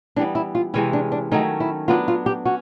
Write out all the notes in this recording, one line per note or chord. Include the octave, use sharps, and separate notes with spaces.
E3 G3 B3 D4
E4
F4
C3 E3 G#3 C#4 E4
D4
D4
D#3 F#3 A3 C#4 D#4
E4
F#3 B3 D4 F4
F4
G4
C#4 F#4